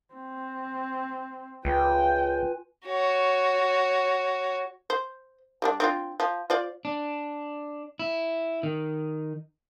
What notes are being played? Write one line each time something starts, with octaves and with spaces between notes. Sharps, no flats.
C4
C#2 F4 B4 G5 G#5
F#4 C#5
C5
G3 A#3 D4
C4 D4 F4
F3
F4 C5 D5
D4
E4
D#3